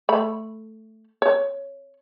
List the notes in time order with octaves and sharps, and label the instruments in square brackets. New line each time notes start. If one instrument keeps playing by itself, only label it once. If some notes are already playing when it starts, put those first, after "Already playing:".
[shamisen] A3 B5
C#5